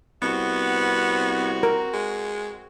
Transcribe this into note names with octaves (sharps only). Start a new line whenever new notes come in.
C2 B3 C4 F#4
A#4
G#3